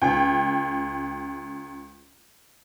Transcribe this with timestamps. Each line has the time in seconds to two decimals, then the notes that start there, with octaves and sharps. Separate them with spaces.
0.02 C#2 G5